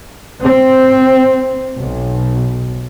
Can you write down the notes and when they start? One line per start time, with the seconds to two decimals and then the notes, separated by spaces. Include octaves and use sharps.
0.43 C4
1.78 B1